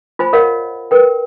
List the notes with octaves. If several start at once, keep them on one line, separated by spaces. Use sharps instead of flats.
F4 C5 G#5 B5
A#4 C#5 D#5 F5 F#5
A#4 B4 G5